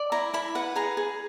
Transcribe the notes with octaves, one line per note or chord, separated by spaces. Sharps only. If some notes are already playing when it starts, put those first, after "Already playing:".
Already playing: D5
E4 A#5
E4 B5
B4 F#5
G#4 A#5
G#4